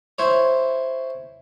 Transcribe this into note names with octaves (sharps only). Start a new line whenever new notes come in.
E4 C5 C#5